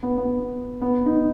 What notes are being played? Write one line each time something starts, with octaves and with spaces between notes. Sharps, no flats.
B3
B3
B3
D#4